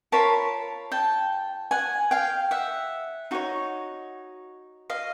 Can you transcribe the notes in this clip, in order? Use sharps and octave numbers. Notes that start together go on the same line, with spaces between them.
F4 A#4 C#5 A5 B5
G5 A5
F#5 G#5
F5 G5
E5 F#5
D#4 F#4 A#4 C#5
D#5 F5